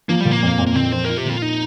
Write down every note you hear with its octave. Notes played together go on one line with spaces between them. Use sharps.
F3 A#3
A#2 G3
A#3
F2
F2
A#3
A#2 C4
F3 C5
F4 A#4
G4
A#2 F4
D#4